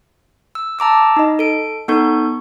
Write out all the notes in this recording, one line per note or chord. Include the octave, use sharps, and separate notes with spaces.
E6
A5 A#5 D6 E6
D#4 D#5
A4 D7
B3 D#4 A4 C#6 G6